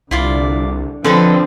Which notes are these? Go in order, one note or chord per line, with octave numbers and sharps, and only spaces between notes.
C2 D3 E4 F4 D5
D3 F3 C4 A4 B4 D#5